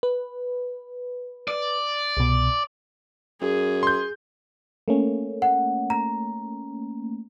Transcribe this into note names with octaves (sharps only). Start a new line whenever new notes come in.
B4
D5
C2 B2
F#2 G#4
C6 G6
A3 A#3 C#4
F#5
A#5